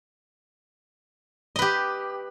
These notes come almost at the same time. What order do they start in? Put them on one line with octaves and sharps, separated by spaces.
D#5 B4 G4